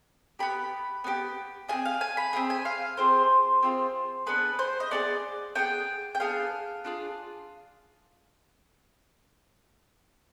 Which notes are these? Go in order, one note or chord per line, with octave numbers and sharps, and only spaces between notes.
B3 D#4 G4 B5
B3 D#4 G4
C4 F4 G#4 G#5
F5
G#5
B5
C4 F4 G#4
G#5
F5
C4 F4 G#4 C5
C4 F4 G#4
B3 D4 G#4 B4
C5
D#5
B3 D4 G#4 D5
B3 D4 G#4 G5
G5
B3 D4 G#4 F5
D4 F4 G#4